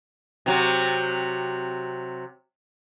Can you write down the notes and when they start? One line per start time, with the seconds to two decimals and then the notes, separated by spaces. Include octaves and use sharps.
0.46 C3 F#3